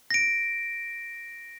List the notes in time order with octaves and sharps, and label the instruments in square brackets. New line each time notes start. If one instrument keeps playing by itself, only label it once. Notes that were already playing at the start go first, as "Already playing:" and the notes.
[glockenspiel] A#6 D7